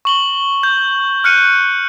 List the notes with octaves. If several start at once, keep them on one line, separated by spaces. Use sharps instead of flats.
C#6 F#7 G7
G6
F6 F#6 C#7 D#7